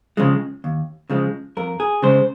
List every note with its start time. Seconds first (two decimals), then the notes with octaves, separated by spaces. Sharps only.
0.17 C#3 F3 G#3
0.64 D#2
1.10 C#3 F3 G#3
1.57 F2 A#4
1.80 G#4
2.02 C#3 G#3 C5